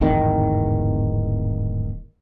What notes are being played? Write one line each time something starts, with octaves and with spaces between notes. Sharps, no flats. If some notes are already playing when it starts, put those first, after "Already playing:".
D1 G#1 E2 D#3